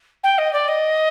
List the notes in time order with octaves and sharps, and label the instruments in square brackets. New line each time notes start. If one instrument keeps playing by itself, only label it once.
[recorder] G5
D#5
D5
D#5